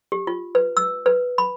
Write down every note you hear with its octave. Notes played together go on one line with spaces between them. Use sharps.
G4
F4
B4
E6
B4
B5